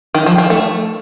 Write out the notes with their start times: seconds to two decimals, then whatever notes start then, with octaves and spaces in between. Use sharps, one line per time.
0.14 D#3
0.26 F3
0.38 F3
0.50 A3